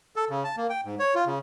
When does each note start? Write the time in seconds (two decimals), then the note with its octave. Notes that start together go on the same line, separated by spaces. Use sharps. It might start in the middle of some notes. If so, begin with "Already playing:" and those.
0.16 A4
0.30 C#3
0.44 A5
0.57 A#3
0.70 G5
0.85 G#2
0.99 C#5
1.15 F4
1.26 C#3